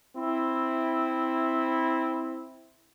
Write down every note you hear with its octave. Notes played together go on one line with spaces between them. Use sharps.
C4 E4